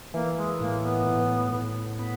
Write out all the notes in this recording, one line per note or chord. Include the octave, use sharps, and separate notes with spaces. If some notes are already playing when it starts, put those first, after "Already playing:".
E3 A#3
G#3
A2 A#3
B3
A2
A2
B3